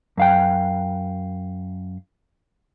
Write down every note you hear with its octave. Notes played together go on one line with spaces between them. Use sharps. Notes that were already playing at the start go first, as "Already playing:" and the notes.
F#2 F5 G5